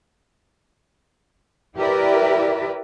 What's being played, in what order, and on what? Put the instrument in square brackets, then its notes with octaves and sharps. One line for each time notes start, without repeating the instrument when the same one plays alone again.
[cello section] E4 G4 A#4 B4 D5 E5